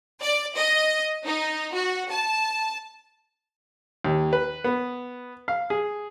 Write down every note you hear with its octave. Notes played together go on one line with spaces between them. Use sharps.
D5
D#5
D#4
F#4
A5
D#2
B4
B3
F5
G#4